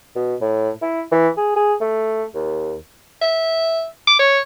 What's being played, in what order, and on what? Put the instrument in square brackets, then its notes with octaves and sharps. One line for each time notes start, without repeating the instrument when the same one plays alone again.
[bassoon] B2
A2
E4
E3
G#4
G#4
A3
D#2
[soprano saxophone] E5
D6
C#5